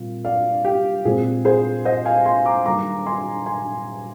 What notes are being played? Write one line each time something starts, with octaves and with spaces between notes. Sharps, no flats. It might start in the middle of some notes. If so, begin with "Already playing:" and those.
Already playing: A#2 G3 C4
D5 F5
G4
A#2 G#3 C4 G#4
G#4 C5
C5 D#5
F5 G#5
G#5 C6
A#5 D6
D#3 G3 A#3 A#5 D6
G#5 C6
G#5 C6